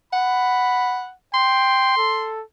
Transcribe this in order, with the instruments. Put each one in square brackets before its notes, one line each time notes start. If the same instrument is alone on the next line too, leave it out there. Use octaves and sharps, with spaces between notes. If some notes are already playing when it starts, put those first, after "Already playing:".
[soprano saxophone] F#5 [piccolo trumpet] B5
[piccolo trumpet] G5 [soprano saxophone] C6
[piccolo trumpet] A4